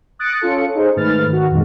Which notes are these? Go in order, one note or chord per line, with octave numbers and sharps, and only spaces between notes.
D#6 F#6 A6 A#6 C#7 D7
C#4 F4 A4 C#7
D#4 G#4 C5
G#2 D#3 A3 B4 F6 A6
D#3 F#4
F2 A#2 D#3 G#3